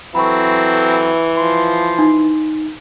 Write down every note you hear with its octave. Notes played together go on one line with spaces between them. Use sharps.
E3 F#3 C4 A4 B5 C#6
F3 C6
D#4